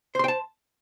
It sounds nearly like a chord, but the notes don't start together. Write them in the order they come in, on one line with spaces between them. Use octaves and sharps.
C5 C6 G5 A5